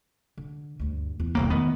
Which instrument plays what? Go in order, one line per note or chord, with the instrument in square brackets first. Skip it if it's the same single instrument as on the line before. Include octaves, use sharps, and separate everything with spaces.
[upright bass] D3
D2 G2
E2 E3
[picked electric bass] D#1 C2 A#3
[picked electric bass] D#3 B3 [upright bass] G#3 A3